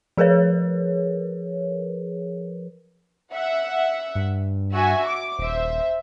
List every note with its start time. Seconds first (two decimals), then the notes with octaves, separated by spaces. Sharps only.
0.17 F3 G#4 A#4 B4 C#5
3.33 E5 F#5
4.15 G2
4.73 F#4 E5 G#5
5.06 D6
5.39 D#1 C5 E5